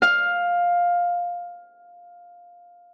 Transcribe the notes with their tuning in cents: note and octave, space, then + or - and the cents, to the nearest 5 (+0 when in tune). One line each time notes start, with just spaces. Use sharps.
F5 +10